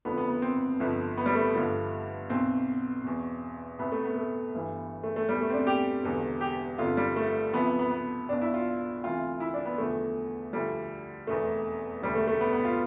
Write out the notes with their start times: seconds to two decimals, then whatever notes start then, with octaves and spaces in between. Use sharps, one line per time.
0.05 F1 F2 D3 F3 B3
0.17 B3
0.30 B3
0.42 C4
0.80 G1 F2 D3 F3
1.17 B3
1.26 G3
1.35 A3
1.55 G1 G2 D3 F3
2.30 B1 B2 C4
3.04 E2 B2
3.79 C2 B2 B3
3.92 A3
4.04 B3
4.17 A3
4.54 G1 G2 E3
5.03 A3
5.16 A3
5.29 E2 B2 G3
5.41 A3
5.50 C4
5.53 D4
5.67 G4
6.03 E1 E2 D3
6.41 G4
6.78 G1 F2 D3 F4
6.97 G3
7.16 A3
7.53 D2 C3 F3 B3
7.67 B3
7.79 B3
7.91 B3
8.29 B1 B2 D4
8.41 E4
8.54 F4
9.03 D2 C3 E3 F4
9.40 E4
9.54 D4
9.65 B3
9.78 E2 D3 F3 A3
10.53 D2 D3 F3 G3
11.27 F1 E2 B2 A3
12.02 E1 D2 D3 G3
12.15 A3
12.27 A3
12.41 B3
12.53 B3
12.65 F4